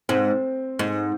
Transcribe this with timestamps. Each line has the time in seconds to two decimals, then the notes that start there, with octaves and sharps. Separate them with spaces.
0.09 G#2 C4
0.79 G#2